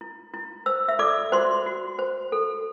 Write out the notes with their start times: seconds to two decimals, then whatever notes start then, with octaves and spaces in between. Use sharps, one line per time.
0.01 E4
0.34 E4
0.66 C5 E6
0.88 E5 E6
0.99 A4 D5 D6
1.32 F#4 C5 C6
1.66 F#4
1.99 C5
2.32 A4